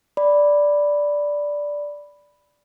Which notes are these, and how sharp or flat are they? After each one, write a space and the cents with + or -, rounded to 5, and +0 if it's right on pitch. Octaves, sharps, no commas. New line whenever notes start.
D5 -5 B5 +0